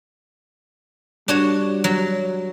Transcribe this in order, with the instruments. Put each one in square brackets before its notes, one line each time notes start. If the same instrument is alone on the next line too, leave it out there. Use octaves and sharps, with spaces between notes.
[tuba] G3 [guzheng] D4 F#4 C#5
[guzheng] F#3